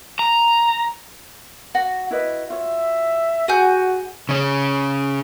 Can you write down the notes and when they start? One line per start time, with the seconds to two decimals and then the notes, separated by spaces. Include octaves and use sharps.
0.19 A#5
1.75 F#4 F#5
2.11 E4 B4 D#5
2.50 F4 C#5 E5
3.48 F#4 G#4 F#5 G#5 G6
4.29 C#3 C#4